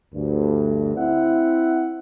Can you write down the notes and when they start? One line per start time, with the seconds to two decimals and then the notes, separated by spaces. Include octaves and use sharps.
0.14 D2 G2
0.97 C4 E4 E5 F#5